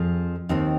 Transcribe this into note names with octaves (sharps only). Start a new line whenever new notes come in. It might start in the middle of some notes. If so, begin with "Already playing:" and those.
Already playing: F2 F3 C4 F4 G#4
D#2 D#3 C4 D#4